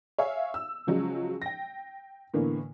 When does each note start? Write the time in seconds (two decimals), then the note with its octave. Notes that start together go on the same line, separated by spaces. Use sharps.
0.18 C#5 E5 F5 G#5
0.54 E6
0.87 C#3 F3 F#3 G#3
1.42 G5 A#6
2.34 A2 D3 E3 A#3 B3